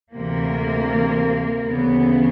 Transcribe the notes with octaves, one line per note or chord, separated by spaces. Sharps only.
D2 C3 E3 A#3
D2 C#3 E3 B3